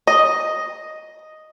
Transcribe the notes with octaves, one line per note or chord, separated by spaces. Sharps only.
D#5